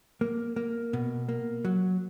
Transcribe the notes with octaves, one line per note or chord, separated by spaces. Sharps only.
A#3
A#3
B2
A#3
F#3